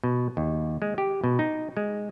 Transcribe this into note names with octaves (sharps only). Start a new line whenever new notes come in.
B2
D#2
G#3
G4
B2
D#4
G#3